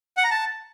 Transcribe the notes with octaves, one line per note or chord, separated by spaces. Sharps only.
F#5
A#5
A5